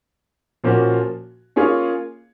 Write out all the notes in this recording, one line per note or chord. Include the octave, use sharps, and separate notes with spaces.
A#2 F3 A#3 C#4 F#4
A#3 C#4 F4 G#4 C#5